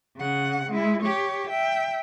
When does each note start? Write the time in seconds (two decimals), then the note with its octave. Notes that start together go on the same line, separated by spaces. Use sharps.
0.17 C#3 F#5
0.71 G#3 E4
1.03 G4 C#5
1.50 E5 G5